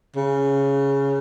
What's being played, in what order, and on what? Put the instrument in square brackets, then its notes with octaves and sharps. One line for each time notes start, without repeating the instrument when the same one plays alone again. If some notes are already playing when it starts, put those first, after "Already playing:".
[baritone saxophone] C#3